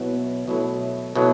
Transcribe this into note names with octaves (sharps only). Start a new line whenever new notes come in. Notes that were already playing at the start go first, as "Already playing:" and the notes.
Already playing: B2 F#3 B3 E4
B2 F#3 A3 E4
B2 F#3 A3 E4